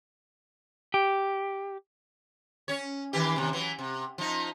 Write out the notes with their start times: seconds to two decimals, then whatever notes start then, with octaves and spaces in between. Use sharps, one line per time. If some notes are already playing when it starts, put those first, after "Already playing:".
0.94 G4
2.68 C#4 C#5
3.13 D#3 E3 G4
3.36 D#2 C3
3.53 E3 F#3
3.79 C3
4.18 F3 D#4